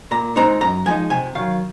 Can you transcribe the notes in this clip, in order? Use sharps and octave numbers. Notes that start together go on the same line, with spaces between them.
A#2 A#5
G#3 C4 D#4 A#5
F#2 A#5
F3 G#3 D#4 G#5
C3 G#5
D#3 F#3 F5